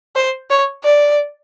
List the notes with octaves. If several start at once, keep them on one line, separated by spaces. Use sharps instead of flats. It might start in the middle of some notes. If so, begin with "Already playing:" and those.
C5
C#5
D5